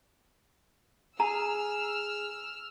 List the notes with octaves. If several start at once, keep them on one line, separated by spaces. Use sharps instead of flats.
G#4 G#5 A#5 E6 F6